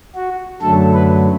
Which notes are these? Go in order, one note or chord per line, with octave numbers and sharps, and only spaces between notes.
F#4
F#2 D3 F#3 A3 A4
B4